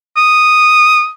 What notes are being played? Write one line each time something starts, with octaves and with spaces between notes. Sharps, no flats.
D#6